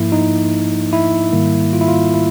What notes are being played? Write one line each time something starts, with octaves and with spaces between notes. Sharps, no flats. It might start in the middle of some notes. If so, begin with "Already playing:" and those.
Already playing: G#2 F3 A#3 E4
D#4
E4
G#2 D#3 G3 A#3
F4
E4
F4
E4